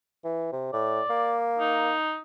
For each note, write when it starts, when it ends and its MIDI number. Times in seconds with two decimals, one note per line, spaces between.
0.24 0.48 52
0.52 0.72 48
0.73 1.01 45
0.73 1.41 74
1.10 1.93 58
1.59 2.19 63